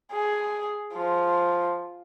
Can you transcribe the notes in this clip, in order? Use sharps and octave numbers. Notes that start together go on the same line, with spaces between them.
G#4
F3